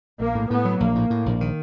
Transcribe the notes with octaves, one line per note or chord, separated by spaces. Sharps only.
A#1 A#3
A2
A2 B3
F#3
A#1 A#3
A2
A2
A#1
D#3